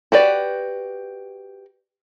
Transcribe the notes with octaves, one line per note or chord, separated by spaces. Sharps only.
F#4 G4 B4 D5